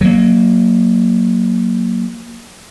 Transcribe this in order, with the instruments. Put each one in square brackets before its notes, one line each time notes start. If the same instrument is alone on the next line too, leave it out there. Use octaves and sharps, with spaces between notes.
[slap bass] F#3 A#3